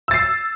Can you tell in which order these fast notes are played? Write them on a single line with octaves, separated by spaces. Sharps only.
E6 A6 C7